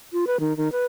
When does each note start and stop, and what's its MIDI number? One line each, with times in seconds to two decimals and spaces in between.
0.13 0.25 65
0.27 0.40 71
0.40 0.56 51
0.57 0.71 51
0.72 0.85 71